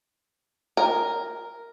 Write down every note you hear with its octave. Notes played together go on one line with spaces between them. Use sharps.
A#4